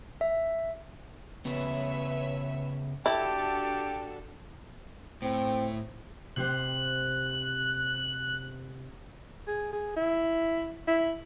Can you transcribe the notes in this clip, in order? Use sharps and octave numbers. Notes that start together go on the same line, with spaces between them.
E5
C#3 B3 B4 C#5 E5
D4 E4 F#4 G4 A4 A5
A2 C4
C3 G4 C5 F#6
G#4
G#4
E4
E4